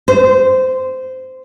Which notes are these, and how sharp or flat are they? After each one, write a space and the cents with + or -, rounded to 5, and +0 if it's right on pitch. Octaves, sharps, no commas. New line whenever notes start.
C5 -15